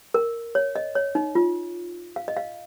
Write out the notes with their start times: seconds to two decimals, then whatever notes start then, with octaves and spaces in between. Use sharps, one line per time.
0.14 A#4
0.55 C#5
0.76 D#5
0.95 C#5
1.15 D#4
1.35 F4
2.16 F5
2.28 D#5
2.37 F5